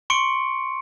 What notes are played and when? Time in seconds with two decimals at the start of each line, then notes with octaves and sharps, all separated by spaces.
0.10 C6 C#6 C#7 D7